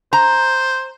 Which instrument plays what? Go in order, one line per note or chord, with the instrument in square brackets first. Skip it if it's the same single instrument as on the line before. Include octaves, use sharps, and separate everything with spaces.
[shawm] C5 [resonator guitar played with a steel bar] A#5